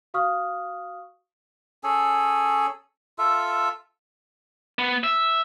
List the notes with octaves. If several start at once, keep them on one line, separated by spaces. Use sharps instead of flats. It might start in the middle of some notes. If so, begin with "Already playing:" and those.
F#4 F5 C#6 D#6 F6
C#4 G#4 A4
F4 A4 E5
B3
E5